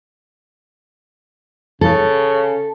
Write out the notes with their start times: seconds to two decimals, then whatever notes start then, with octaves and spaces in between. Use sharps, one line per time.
1.81 C#3 A4